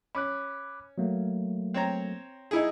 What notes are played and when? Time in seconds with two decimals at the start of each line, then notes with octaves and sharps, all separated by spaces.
0.15 C#4 B5 D6 F#6
0.98 F#3 A3 A#3
1.74 C4 C#5 A#5
2.51 D#4 E4 G#4